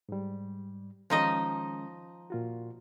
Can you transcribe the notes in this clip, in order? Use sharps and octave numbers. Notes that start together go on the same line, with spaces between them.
G#2 G3
D#3 F3 G#3 C#4 D#4 D#5
A#2 F4 F#4